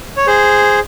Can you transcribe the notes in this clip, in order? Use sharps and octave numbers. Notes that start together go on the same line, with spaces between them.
C#5
G#4 C5